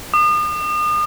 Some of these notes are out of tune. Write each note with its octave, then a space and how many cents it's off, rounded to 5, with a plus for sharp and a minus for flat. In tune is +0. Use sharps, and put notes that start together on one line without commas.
D#6 -40